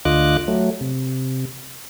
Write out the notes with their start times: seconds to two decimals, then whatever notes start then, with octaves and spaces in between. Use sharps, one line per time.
0.05 D2 D3 F4 D#5 D6 F#6
0.48 F#3 A3
0.81 C3